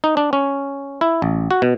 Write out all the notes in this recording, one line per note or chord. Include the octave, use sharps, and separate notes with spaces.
D#4
D4
C#4
E4
A1
F#4
B2